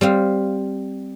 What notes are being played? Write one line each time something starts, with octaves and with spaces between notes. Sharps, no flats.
G3 C4 F5